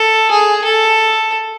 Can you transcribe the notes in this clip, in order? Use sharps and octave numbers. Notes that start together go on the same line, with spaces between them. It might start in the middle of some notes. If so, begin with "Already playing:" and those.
Already playing: A4
G#4
A4